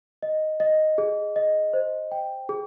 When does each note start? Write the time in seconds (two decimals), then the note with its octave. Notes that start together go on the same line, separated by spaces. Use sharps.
0.23 D#5
0.60 D#5
0.98 G#4
1.36 D#5
1.73 C5
2.11 G5
2.49 G#4